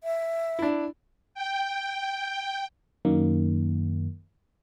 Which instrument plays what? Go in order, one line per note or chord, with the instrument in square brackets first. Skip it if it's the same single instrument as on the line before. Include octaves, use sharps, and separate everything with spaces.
[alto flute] E5
[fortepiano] D4 E4
[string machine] G5
[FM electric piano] F#2 D#3 A#3